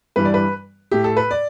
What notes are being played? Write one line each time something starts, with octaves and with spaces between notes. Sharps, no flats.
G2 E3 G3 B4
D5
B4
A2 A3 G4
A4
B4
D5